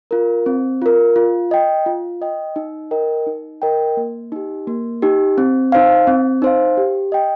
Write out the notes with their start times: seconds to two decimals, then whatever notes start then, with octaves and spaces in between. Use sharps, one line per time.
0.11 F4 A#4
0.46 C4
0.82 F4 A#4
1.16 F4
1.51 D#5 G5
1.86 F4
2.22 D#5 G5
2.56 D#4
2.91 A#4 D#5 G5
3.27 D#4
3.62 A#4 D#5 G5
3.97 A#3
4.32 D#4 G4
4.67 A#3
5.02 D#4 G4
5.38 C4
5.72 D#4 C5 F5
6.07 C4
6.42 D#4 C5 F5
6.77 G4
7.12 D#5 G5